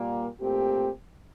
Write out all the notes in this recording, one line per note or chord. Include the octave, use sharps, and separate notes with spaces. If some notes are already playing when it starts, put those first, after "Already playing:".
Already playing: A#2 G3 A#3
A#2 A3 C4 G4